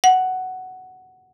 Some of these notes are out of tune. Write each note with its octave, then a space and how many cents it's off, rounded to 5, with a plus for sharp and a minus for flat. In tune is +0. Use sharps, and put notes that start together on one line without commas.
F#5 +5